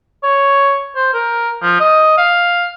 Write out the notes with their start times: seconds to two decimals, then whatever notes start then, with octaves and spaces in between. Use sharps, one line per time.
0.23 C#5
0.95 C5
1.14 A#4
1.62 F3
1.79 D#5
2.17 F5